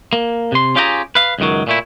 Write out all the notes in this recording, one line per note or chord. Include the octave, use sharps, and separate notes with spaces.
A#3
C3 C6
C#4 F4 G4 G#4 G5 A#5
B4 F5
C#2 F#2 D#3 F#3
A#2 A3 E4